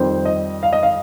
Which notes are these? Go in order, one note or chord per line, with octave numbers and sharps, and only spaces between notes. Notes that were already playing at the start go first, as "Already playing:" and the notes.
Already playing: F2 D#3 G3 C5
D#5
F5
D#5
F5